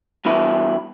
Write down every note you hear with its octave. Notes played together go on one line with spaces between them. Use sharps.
G2 B2 E3 E4